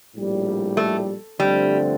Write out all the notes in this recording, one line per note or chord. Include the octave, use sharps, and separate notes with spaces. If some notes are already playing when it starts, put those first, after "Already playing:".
A#1 A2 G3
A3
G2 D3 F3 G3 A3 C4